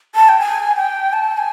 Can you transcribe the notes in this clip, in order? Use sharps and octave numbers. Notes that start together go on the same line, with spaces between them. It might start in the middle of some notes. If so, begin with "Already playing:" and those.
A5
G5
G#5
G5
A5
G#5